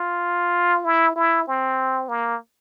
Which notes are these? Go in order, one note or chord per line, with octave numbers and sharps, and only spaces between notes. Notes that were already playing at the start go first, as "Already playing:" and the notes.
Already playing: F4
E4
E4
C4
A#3